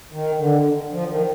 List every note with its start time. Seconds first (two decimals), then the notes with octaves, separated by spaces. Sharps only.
0.12 D#3
0.38 D3
0.92 F3
1.10 D#3